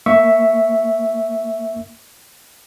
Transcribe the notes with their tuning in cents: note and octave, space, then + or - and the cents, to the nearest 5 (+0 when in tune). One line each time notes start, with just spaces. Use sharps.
A#3 -15 E5 +0 C#6 +5